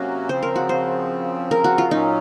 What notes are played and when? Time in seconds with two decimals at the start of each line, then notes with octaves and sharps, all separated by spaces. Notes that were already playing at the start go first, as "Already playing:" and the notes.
Already playing: C3 F#3 A#3 C#4 F#4
0.29 C#3 F3 C4 C5
0.43 A#4
0.56 F#4
0.69 C5
1.51 A#4
1.64 F#4
1.78 F4
1.91 A#2 F#3 C#4 D#4